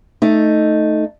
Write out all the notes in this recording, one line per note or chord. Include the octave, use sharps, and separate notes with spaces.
A3 D#4